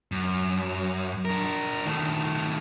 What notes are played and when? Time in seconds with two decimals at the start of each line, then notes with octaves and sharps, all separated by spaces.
0.12 F#2
1.25 D4 A#4
1.86 D#3 A3